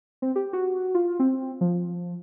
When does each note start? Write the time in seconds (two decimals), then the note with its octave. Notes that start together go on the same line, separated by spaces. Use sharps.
0.22 C4
0.36 G4
0.53 F#4
0.95 F4
1.20 C4
1.61 F3